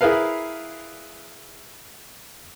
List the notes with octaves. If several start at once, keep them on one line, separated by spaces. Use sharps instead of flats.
E4 G#4 A#4 B4 F5